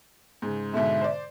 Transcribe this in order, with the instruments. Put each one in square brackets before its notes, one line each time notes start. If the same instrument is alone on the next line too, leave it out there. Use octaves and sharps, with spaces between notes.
[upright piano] G#2 C#3
[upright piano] G#2 B2 D3 [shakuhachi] E5
[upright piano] C5 D5